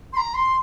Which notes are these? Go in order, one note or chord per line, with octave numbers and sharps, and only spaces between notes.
C6
A#5
C6